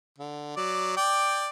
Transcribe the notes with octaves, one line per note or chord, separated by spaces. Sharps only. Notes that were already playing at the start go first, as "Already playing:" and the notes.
D3
F#3 D5
D5 G5